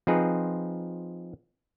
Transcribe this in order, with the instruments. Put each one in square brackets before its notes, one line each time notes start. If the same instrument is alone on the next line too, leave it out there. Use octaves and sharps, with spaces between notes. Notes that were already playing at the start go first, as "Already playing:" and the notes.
[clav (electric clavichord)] F3 C4 D#4 G#4 B4